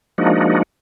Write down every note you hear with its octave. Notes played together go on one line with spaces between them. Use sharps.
F3 G#3 A#3 D4 D#4 F#4